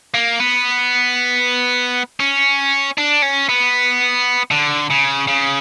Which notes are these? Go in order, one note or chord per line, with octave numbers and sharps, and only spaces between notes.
A#3
B3
C#4
D4
C#4
B3
D3
C#3
C#3